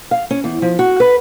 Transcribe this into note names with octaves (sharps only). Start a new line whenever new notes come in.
F5
C#4
E2
F3
F#4
B4